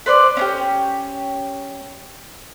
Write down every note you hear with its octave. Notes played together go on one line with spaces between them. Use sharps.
B4 C5 D5
C#4 D4 G4